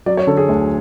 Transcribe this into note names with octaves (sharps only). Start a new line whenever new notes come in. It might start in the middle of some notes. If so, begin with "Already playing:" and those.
F#3 D5
C#5
D3 A4
G#4
D2